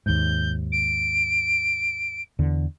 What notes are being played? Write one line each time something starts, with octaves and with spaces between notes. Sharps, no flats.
D#2 G#2 G6
D7
E2 D3